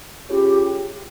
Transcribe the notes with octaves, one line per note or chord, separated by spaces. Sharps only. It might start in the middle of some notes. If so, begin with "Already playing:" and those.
C#4 F4 G4 G#4 C#5